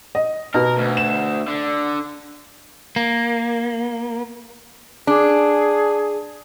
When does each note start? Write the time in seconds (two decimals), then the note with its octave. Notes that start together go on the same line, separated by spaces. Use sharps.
0.15 D#5
0.54 B2 A#4
0.78 D2
0.97 E7
1.48 D3
2.96 A#3
5.07 D4 G#4